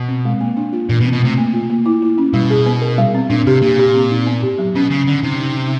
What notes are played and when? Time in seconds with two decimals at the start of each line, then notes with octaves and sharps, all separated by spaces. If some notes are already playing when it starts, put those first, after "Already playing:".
Already playing: B2
0.08 C4
0.25 G#3
0.41 A#3
0.57 D4
0.73 F4
0.89 A#2 E3
1.01 B2
1.06 C4
1.13 B2
1.21 C3 A3
1.38 A#3
1.53 F4
1.70 A#3
1.86 E4
2.02 E4
2.18 C#4
2.34 B2 G3
2.50 G#4
2.66 B3
2.82 A#4
2.98 G3
3.14 C4
3.30 A#2 D4
3.47 C3 G4
3.62 A#2 G4
3.79 G4
3.95 C4
4.11 D#4
4.27 B3
4.43 G4
4.58 F#3
4.75 B2 C#4
4.91 C#3 C#4
5.07 D3 C#4
5.23 C3 D#4
5.39 D#4
5.56 D#4